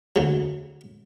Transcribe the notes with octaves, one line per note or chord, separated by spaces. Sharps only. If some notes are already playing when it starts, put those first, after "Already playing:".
D2 F#3